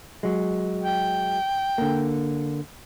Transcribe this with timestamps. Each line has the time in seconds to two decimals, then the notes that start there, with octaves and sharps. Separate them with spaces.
0.23 F#3 G#3
0.83 G5
1.78 D3 A#3